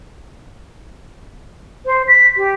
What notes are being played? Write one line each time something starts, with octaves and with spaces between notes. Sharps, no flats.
C5
B6
G4